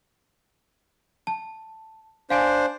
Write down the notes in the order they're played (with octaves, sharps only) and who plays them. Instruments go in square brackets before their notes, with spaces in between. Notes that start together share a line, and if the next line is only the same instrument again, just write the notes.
[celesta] A5
[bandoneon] D4 C5 [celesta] F5 G#5 D7